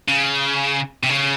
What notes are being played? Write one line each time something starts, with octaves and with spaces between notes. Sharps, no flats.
C#3
C3
C#3